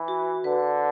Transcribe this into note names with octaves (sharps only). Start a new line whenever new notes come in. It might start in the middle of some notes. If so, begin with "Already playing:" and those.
Already playing: E3
F#4
D3 B4